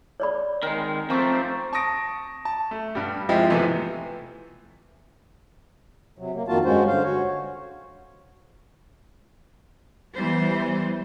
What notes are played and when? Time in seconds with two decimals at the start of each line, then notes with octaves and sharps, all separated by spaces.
0.20 C#5 D5 B5
0.63 D#3 G#3 C4 A#4
1.10 F3 A3 C4 A#5 C#6 D6
1.73 A5 C#6 D#6 A#6 D7
2.45 A5
2.71 A3
2.95 G2 G3
3.29 F3 G#3 C4 E4 G4
3.50 C3 E3 F3 A3 B3
6.18 C3 F#3
6.35 A#3
6.48 F2 D#3 A#3 F4 F#4 A5
6.65 G2 G#3 C#4 F#4 C5
6.87 D3 C5 F5
7.03 F#4 C#5
10.15 E3 G3 B3 C5